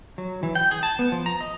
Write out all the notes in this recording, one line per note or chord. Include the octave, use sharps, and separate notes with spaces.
F#3
E3
G5
G#4
A5
B3
F3
A#5
D#5